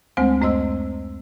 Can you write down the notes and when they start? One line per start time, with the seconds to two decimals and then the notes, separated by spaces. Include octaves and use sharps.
0.17 D2 G#3 A3 C4 C5 G#5
0.41 F#2 A3 C5 D#5 C6 E6